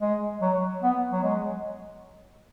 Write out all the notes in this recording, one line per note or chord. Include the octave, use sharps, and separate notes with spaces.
G#3
F#3
B3
F#3
G#3